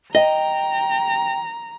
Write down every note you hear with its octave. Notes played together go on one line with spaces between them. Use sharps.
D#5 G5 A#5